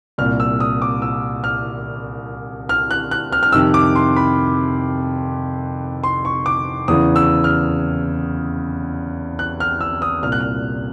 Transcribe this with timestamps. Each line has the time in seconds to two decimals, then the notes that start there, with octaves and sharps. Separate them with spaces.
0.18 C2 A#2 F6
0.40 E6
0.60 D#6
0.82 D6
1.02 E6
1.44 F6
2.69 F6
2.91 F#6
3.11 F#6
3.32 F6
3.43 F6
3.52 F2 C3 D#3 E6
3.74 D6
3.96 C6
4.16 B5
6.04 C6
6.25 C#6
6.46 D6
6.88 E2 C#3 E3 D#6
7.16 E6
7.44 F6
9.39 F#6
9.60 F6
9.81 E6
10.02 D#6
10.22 C2 A#2 F6
10.32 F#6
10.40 F6